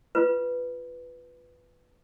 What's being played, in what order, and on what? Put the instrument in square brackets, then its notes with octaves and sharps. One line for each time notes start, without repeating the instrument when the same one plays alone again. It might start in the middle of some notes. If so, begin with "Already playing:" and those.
[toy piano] F4 B4